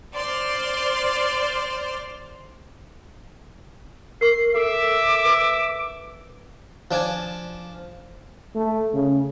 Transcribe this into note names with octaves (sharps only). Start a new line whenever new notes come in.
C5 D5 C6 F6
A#4 C#6 C7
A4 E5 D6
B4
F3 D4 D5 G#5
A3
C#3